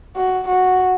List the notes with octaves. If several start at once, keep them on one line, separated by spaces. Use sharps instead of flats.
F#4
F#4